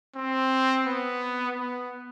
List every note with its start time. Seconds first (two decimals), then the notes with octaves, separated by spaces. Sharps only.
0.15 C4
0.86 B3
1.58 B3